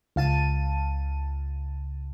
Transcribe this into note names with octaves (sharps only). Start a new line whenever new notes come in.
C#2 F5 A5 D#7